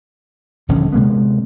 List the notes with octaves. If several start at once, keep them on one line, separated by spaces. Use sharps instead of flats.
D#1 A#1 D3 C#4
C3 G#3 A#3 B3